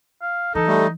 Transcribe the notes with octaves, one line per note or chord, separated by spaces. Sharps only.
F5
E3 D#4 A4
G3 A3